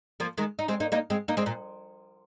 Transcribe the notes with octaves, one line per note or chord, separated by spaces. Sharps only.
F3 A#3
D#3 G#3
D#4
G#3 C4
A#3 D#4
A#3 D#4
G#3 C4
A#3 D#4
G#3 C4
A#2